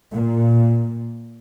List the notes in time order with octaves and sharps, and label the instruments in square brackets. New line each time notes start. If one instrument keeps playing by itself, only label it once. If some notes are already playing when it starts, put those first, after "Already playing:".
[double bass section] A#2